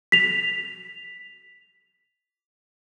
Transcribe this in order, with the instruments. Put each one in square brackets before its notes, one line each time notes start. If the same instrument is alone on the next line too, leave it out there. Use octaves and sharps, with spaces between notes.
[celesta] B6 F7